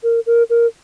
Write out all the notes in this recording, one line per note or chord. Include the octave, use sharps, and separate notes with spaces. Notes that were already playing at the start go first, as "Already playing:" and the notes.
A#4
A#4
A#4